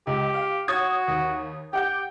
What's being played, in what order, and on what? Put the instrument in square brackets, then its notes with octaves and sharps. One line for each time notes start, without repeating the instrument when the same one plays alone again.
[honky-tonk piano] C#2 [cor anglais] G4
[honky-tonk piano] F5
[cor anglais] F#4 [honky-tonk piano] C#5 D#6 G#6
[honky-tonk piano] D#2
[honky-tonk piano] G4 F#5 G6 [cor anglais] G5